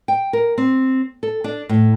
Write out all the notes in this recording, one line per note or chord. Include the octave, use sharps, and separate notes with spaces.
G5
A#4
C4
A4
D4
A2